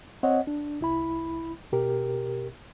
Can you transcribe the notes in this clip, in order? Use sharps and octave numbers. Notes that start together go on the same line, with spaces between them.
C4 C#5 D#5 F#5
D4
C2 E4 B5
B2 G4 A#4